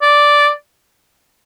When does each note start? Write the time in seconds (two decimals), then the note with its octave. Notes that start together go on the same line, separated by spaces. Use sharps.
0.02 D5